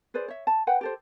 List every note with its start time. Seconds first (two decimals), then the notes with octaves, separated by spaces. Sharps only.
0.14 G#4 B4 C5 D5
0.28 C#5 E5
0.47 A5
0.67 B4 F#5 G5
0.81 G4 A4 C5